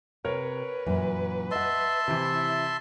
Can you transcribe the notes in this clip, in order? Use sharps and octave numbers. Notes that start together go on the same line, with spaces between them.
C3 A#4 B4 C#5
F#2 A#2 E3
D#5 E5 F#5 A5 C6
C3 E3 E4